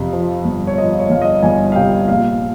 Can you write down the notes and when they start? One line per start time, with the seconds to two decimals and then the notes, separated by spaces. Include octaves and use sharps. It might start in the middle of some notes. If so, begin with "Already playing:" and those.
Already playing: F2 C3
0.13 F3
0.45 G1
0.67 C#5
0.78 F3 D#5
0.99 C#5
1.10 G1 F5
1.22 D#5
1.42 G1 G#5
1.72 F5
1.75 C3 G5
2.08 A#1 F5